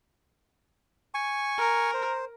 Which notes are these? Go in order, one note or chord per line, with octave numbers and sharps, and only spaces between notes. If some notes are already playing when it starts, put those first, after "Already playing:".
G#5 C#6
A#4
C5